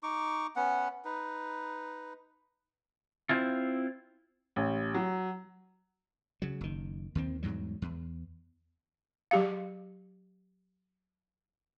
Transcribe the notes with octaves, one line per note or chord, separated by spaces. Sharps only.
D#4 C#6 D6
B3 C#4 F#5
D#4 B4
C4 E4 F4
A1
F#3
C#3 F#3
F#1 D#3
D#2 D#3 C4
E2 G#2 F#3 G3
E2
F#3 G4 F5